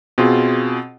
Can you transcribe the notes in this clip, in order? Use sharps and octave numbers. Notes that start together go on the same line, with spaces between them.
B2 C4 F4 G#4